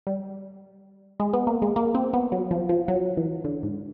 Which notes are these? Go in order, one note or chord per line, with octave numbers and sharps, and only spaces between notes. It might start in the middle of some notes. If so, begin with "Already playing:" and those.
G3
G#3
B3
A#3
G#3
A#3
C4
B3
F#3
F3
F3
F#3
E3
D3
G#2